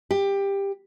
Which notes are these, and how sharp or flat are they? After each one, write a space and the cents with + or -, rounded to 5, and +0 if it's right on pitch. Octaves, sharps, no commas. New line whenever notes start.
G4 +15